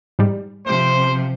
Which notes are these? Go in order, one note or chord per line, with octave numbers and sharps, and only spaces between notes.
G#2 G3
C3 F3 C5